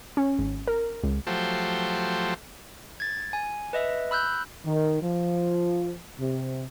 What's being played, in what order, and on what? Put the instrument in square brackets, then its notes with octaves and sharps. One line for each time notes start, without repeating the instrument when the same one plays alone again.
[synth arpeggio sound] C#4
G#1
A#4
C#2
[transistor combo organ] F3 F#3 A3 G4 C5
[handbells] G#6 A6
G#5
B4 D#5 E5
B5 E6 F#6 G6
[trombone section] D#3
F3
C3